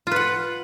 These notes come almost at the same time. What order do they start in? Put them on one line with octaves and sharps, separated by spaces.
F4 B4 F#5